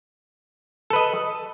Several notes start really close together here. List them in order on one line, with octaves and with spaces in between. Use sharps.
A4 B4 D#5